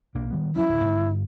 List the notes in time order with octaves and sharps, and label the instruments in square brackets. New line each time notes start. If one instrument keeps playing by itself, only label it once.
[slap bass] B1 A#3 D4
D#3 G3 B3
[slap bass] F3 F#3 C#4 [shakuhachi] E4
[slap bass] D1
G2 D3